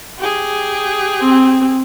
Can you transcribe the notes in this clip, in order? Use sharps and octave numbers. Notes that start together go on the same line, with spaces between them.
G4 G#4
C4